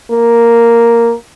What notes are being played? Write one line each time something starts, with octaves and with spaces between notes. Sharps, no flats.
A#3